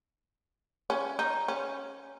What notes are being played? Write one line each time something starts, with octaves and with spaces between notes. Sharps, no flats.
C#4
D#4
C#4